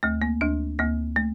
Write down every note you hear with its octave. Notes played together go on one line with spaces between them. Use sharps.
D2 A3
A#3
D2 D4
D2 A#3
A3